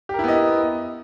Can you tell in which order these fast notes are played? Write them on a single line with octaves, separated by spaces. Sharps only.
G4 A#4 E4 B3 D#5